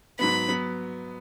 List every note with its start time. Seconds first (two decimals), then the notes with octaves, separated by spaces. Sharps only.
0.19 G#2 F#3 B3 B5
0.48 F#3 B3